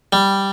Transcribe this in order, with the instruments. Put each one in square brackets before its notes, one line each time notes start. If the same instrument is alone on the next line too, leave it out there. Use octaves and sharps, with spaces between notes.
[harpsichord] G3